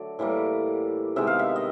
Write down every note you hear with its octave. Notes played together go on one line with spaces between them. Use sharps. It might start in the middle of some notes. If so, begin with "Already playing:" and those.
Already playing: D3 F#3 A3 D5
A2 E3 G3 A#3
C3 D#3 G#3 B3 E5
F5
E5
D#5